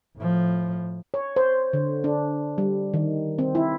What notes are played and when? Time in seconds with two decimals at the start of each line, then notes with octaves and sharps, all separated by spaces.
0.17 A2 F3
1.14 C#5
1.36 C5
1.73 D3
2.04 D4
2.58 G3
2.94 D#3
3.39 C4
3.55 E4